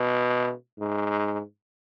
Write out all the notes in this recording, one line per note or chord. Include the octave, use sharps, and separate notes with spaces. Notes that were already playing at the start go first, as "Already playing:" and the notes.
Already playing: B2
G#2